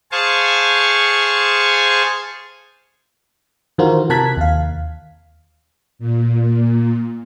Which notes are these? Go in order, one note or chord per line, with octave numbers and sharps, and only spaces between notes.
G#4 C5 F5 G#5 A5 C#6
D#3 E3 F4 F#4 A#4 C5
C3 A#4 A5 F#6 G#6 B6
D#2 F5
A#2